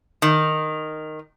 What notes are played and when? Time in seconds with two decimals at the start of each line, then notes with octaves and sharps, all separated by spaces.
0.22 D#3